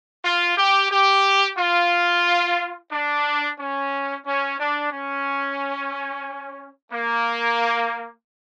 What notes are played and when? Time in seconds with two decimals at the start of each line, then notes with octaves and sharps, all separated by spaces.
0.25 F4
0.58 G4
0.92 G4
1.58 F4
2.91 D4
3.59 C#4
4.26 C#4
4.59 D4
4.92 C#4
6.93 A#3